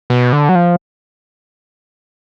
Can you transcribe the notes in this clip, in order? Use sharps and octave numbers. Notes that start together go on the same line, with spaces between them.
B2
D3
F#3
F3